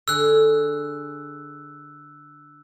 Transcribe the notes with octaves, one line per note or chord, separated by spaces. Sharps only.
D3 G#4 E6 F#6